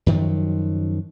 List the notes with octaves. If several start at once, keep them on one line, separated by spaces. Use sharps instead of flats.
F#2 D#3 F3 F#3